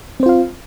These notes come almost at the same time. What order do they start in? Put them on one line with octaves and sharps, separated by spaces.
C4 C5 F4 F5